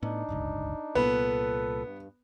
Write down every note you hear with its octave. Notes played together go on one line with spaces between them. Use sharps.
A2 B3 D4 D#4
D1 G1 C#2
C2 A#2 B3 A4 B4
G2